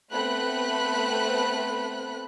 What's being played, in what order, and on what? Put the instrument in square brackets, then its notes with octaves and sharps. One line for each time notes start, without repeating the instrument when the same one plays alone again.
[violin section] A3 B3 C4 B5 F#6